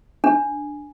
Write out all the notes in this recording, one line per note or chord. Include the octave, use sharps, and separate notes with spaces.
D4